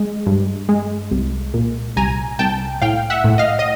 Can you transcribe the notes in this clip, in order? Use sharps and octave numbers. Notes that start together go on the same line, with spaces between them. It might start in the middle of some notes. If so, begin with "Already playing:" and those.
Already playing: G#3
G2
G#3
C2
A#2
C2 G#5 A#5
C2 G5 A5
A2 F5 G5
E5 F#5
A2
D#5 F5
D#5